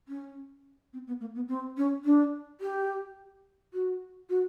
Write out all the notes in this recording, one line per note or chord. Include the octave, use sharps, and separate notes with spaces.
C#4
C4
B3
A#3
B3
C4
C#4
D4
G4
F#4
F#4